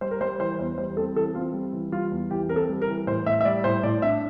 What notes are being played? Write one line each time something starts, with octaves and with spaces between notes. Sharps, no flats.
G3 C5
A#4
G3 C5
E3 C5
E2 C5
G3 C5
C4 A4
E3 A4
C4 F4
G3
E3
G3 F4
E2
E3 G4
C4 A#4
A4
G3
A#4
E3
A2 C5
A2 E5
E5
G3 D5
A2 C5
A2 D5
D4 E5